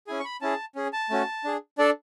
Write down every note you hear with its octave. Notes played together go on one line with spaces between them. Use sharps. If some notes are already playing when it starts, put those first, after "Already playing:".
C#4 E4 G#4 G#5
C#6
B5
C#4 E4 G#4 A5
C#4 G#4
A5
A3 C#4 F#4
D4 G#4
D4 A4 D5